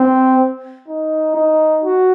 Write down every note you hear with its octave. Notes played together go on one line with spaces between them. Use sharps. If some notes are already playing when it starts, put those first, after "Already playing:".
Already playing: C4
D#4
D#4
F#4